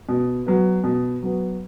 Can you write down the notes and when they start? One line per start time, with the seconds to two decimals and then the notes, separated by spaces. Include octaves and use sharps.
0.09 B2
0.46 F#3 B3
0.84 B2
1.23 F#3 B3